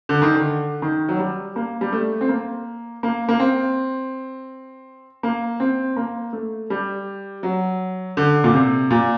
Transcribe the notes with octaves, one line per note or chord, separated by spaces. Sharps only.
D3
D#3
D3
D#3
F#3
G3
A#3
G3
A3
C4
A#3
A#3
A#3
C4
A#3
C4
A#3
A3
G3
F#3
D3
A#2
C3
A#2